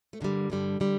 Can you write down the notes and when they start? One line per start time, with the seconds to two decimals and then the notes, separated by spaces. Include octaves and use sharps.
0.13 A3
0.20 G2 D3 G3 A#3
0.50 G2 D3 G3
0.80 D3 G3